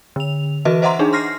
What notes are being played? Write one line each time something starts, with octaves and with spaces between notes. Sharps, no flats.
D3 F7
E3 F#4 B4 D#5 E5
C5 D#5 E5 F#5 A#5 C6
D4 D#4 G#4
C6 F6 A#6 C7